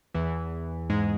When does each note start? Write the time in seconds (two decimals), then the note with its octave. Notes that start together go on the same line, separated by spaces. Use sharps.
0.14 E2 E3
0.90 G#2 G#3